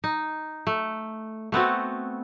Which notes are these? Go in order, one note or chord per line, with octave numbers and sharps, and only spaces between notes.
D#4
A3
A3 B3 C4 F#4